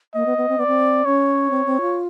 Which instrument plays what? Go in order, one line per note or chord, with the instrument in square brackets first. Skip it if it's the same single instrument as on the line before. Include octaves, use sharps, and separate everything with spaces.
[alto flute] A#3 [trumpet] D#5
[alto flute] B3
B3
C4
[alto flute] B3 [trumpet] D5
[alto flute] C4
[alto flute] C#4 [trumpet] C#5
[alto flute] C4
C4
F4